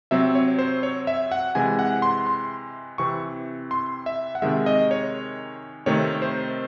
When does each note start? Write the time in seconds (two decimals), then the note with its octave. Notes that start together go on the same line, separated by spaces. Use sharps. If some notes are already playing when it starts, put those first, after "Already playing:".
0.11 C3 F#3 C4 E5
0.35 C#5
0.59 C5
0.83 C#5
1.07 E5
1.31 F#5
1.55 C3 E3 G#3 G#5
1.79 F#5
2.02 C6
2.27 C6
2.98 C3 E3 C4 C#6
3.71 C6
4.06 E5
4.35 F#5
4.42 C3 D#3 G#3 E5
4.66 D#5
4.91 C#5
5.86 C3 D#3 A3 C4 C#5
6.22 C5